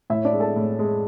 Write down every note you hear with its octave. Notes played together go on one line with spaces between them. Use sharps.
A2 E4 E5
C#5
D4 D5
G#3
A4 A5
A2
G#3